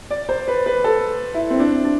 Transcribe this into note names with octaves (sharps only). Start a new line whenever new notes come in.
D5
C5
B4
B4
A4
E4
C4
D4
D4